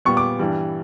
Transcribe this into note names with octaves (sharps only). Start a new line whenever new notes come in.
A#2 G3 B3 C#6
D6
G2 E3 G3